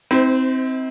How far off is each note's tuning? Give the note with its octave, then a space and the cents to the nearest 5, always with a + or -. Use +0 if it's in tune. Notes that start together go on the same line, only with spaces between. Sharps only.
C4 -5 D#4 +45 C5 -30